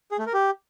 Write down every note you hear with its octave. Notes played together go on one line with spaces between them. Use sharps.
G#4
A3
A#4
G4